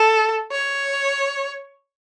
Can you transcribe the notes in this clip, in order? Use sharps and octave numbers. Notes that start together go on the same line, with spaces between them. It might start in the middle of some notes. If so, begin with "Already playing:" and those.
Already playing: A4
C#5